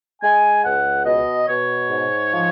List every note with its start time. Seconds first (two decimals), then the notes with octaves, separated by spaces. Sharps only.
0.22 G#3 G#5
0.64 C#2 F#5
1.05 B2 D#5
1.48 B2 C#5
1.90 G#2
2.31 F3